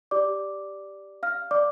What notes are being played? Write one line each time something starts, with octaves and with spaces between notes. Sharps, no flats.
G4 D5 D6
F5 F6
D5 D6